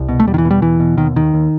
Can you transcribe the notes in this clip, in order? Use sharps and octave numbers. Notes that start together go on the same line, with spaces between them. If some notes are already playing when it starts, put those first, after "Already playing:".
Already playing: C2
B2
A3
E2 G3
D#3
E3
B2
G3
E2 E3
B2
D#2 D#3
D#2 D#3
D#2